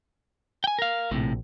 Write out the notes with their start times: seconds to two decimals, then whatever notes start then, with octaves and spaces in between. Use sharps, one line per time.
0.64 G5 G#5
0.79 A#4 F5
1.11 A#1 A2 C3